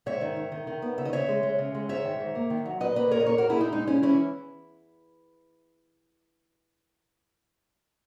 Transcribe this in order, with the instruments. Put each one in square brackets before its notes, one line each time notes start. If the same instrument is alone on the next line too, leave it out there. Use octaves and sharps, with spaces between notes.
[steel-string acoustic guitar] G#2 C#5 E5
D#3
D#3
D#3
D#3
B3
C#3 E5
D#5
C#3 C#5 E5
G#3
G#3
C#3
G#3
G#2 C#5 E5
D#3
G#2
A#3
D#3
F#3
A#2 B4 D#5
A#3 B4 D#5
A#2 A#4 C#5
D#5
A#3 A#4 C#5
A#3 F#4 A#4
E4 G#4
A#2 D#4
G#3 D#4
G#3 C#4 E4
E3 C#4 E4